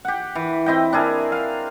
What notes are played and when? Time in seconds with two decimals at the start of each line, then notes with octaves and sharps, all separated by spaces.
0.05 G4 F#5
0.35 E3
0.66 C4 E4 D#5 G5
0.93 D4 E4 G#4 A#4
1.32 F5